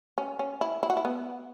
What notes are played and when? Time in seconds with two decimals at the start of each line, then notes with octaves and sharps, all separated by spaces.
0.18 C#4
0.39 C#4
0.61 E4
0.83 E4
0.90 F#4
0.97 E4
1.05 B3